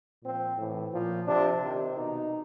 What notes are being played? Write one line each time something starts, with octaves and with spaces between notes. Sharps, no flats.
A#2 F3 C4
A2 E3
A#2 F3
C3 F3 D4
C3 D#3
B2 D#4